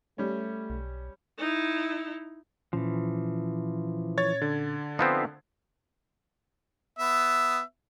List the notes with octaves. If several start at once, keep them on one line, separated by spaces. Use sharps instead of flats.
G3 A3 C#4
B1
D#4 E4
A#2 E3 F3 C#4
C#5 G#6 A6
D3
F3 B3 C4 D#4 C5 E5
B3 E5